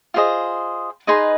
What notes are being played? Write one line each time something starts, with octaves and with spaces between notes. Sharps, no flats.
F4 G#4 C5 D#5
D#4 G#4 B4 D#5 C6